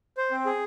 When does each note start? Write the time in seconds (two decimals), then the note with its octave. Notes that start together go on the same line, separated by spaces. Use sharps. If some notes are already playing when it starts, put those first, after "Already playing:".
0.17 C5
0.31 C4
0.46 G#4